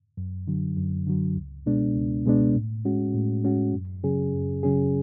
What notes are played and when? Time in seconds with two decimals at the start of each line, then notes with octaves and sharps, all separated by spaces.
0.17 F#2
0.47 D3 F#3
0.77 F#2
1.07 D3 F#3
1.36 C#2
1.66 B2 G#3 B3 D4
1.96 C#2
2.25 B2 G#3 B3 D4
2.55 A2
2.85 G#3 C#4 F#4
3.14 A2
3.44 G#3 C#4 F#4
3.73 F#2
4.04 C#3 F#3 C#4 G#4
4.34 F#2
4.63 C#3 F#3 C#4 G#4